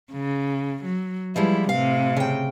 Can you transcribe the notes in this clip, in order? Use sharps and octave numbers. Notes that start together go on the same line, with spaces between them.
C#3
F#3
F3 G3 G#3 E4
A2 C3 F5
C#3 G5